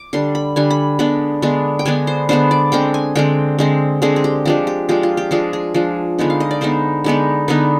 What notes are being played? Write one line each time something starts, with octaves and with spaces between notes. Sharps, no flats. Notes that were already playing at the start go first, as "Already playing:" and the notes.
Already playing: D6
D3 G3 D4 C6
B5
D3 G3 D4 G#5
B5
D3 G#3 B3 D4 B5
D3 G#3 B3 D4
G5
D3 G#3 B3 D4 G#5
C5
D3 G#3 B3 D4 C5
D5
D3 G#3 C4 G5
G#5
D3 G#3 C4 G5
D3 G#3 C4
D3 G#3 C4 G#4
G#4
G4
F3 G#3 D4 G4
G4
F3 G#3 D4 G4
F4
G4
F3 G#3 D4 G#4
G#4
F3 G#3 D4
D3 G#3 B3 D#4
F5
D#5
D5
D3 G#3 B3 D#4 C5
D3 G#3 B3 D#4
D3 G#3 B3 D#4 B4